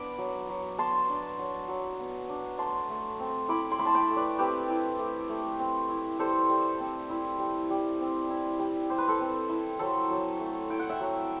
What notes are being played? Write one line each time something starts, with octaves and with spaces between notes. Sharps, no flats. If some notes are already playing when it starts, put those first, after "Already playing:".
Already playing: B3 D4 B5 D6
F#3
F#3
B3 A5 C6
D4
F#3
F#3
B3
D4
A3 A5 C6
A3
C4
E4 B5 D6
C6
A3 B5
A5 C6
G5 B5
A3
B4 D5
C4 G4 B4
E4
A3
A3
C4
E4
G3 A4 C5
G3
C4
E4
G3
G3
C4
E4
G3
G3 C5
B4
A4 C5
C4
E4
F#3 A4 C5
F#3
A3
E4 G5
F#5
E5 G5
F#3